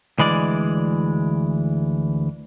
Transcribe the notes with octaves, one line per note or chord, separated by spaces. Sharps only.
D2 E3 G#3 D5